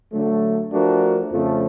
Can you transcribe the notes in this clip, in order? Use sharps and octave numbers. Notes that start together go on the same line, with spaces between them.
D3 F#3 A3
F3 A3 D4 F#4 A#4
F2 C#3 F3 A3